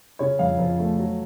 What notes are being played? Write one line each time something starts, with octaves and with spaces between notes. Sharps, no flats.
C#3 C#5
F2 F5
F3
A3
F#3